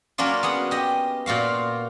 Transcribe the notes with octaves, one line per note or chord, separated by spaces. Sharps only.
F#3 A#3 C#4 D4 F4
B3 G#4 F#5
G4 D#5
A#2 F4 F#4 F5